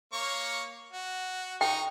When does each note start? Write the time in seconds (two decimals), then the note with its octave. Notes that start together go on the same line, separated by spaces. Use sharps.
0.13 A#3 C#5 C#6
0.92 F#4
1.61 D#4 G5 C#6